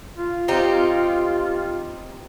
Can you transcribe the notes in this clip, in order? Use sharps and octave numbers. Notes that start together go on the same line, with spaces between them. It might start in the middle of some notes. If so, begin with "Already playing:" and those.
F4
C4 D#4 G4